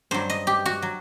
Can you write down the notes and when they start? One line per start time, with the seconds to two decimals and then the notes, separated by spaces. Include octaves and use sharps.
0.11 G2 F#3 C5
0.30 D#5
0.47 G4
0.66 F#4
0.82 F#3